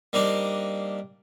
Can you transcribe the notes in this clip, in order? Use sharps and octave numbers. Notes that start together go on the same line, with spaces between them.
G3 A#3 C4 D4 D#4 G4